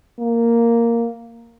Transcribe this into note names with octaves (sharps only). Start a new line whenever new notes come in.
A#3